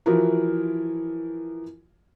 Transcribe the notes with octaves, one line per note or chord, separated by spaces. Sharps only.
E3 F3 E4 F#4 A#4